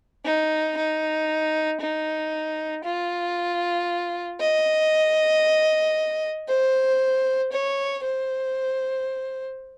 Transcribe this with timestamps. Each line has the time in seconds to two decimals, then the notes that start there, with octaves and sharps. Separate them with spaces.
0.25 D#4
0.77 D#4
1.81 D#4
2.85 F4
4.40 D#5
6.48 C5
7.52 C#5
8.04 C5